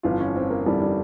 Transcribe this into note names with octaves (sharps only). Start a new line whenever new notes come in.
G1 F2 E3 F4
C#4
C4
A#3
G1 F2 E3 G3
G3